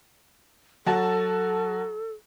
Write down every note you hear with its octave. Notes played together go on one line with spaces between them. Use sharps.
F#3 F#4 A4 A5